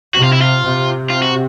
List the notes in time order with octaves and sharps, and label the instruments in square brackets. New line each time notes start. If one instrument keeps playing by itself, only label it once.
[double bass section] C3 [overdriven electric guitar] F#4
[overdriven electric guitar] F4
E4
F4
[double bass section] C3
[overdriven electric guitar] F4
F#4